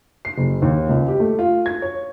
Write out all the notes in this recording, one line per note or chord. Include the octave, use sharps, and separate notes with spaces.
C7
F#1
D#2
C#2
G4
A3
F4
G#6
C#5